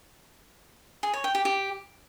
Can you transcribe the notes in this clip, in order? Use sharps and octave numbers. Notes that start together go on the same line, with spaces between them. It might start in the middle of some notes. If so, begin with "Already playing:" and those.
G#4
C#5
G5
G4
G4